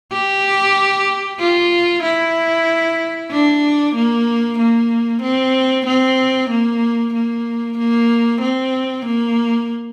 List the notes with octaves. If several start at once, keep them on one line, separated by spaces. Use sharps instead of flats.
G4
F4
E4
D4
A#3
A#3
C4
C4
A#3
A#3
A#3
C4
A#3